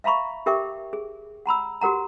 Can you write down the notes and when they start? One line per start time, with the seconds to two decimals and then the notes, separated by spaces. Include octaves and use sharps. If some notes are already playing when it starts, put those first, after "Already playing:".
0.04 E5 F5 A#5 B5 C#6
0.46 G4 A#4 E5 G5 C#6 D6
0.93 G#4
1.46 F#5 A#5 B5 E6
1.81 F#4 G4 A#4 F#5 A#5